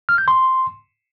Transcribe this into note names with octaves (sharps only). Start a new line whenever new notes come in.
F6
G6
C6